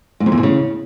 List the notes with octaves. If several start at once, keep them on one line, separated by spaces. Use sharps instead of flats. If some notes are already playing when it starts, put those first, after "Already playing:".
G#2
F2
E2
B2
C#3